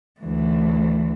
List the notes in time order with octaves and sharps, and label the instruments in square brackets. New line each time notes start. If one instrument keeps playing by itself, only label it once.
[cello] D2 E3